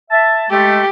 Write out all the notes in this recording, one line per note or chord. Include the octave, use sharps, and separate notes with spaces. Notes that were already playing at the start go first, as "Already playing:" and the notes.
E5 A5
G#3 A3 G4